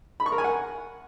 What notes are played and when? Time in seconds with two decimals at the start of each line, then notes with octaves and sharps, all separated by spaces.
0.20 B5
0.26 C#6
0.32 A#4
0.38 G#5
0.44 F#5